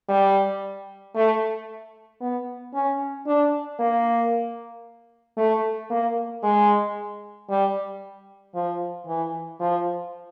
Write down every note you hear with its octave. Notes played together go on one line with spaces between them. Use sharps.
G3
A3
B3
C#4
D4
A#3
A3
A#3
G#3
G3
F3
E3
F3